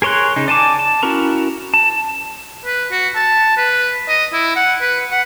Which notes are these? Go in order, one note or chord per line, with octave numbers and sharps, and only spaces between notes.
G#4 A#4 C#5 C6 F#6
C#3 D#4
D5 G#5 A5 D6
A5
C#4 E4 F#4 A#4 A#5
A5
B4
F#4
A5
B4
D#5
E4
F#5
B4
F#5